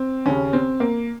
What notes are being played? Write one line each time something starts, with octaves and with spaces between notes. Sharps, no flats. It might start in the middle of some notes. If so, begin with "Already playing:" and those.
Already playing: C4
D#2 C#3 C#4
C4
A#3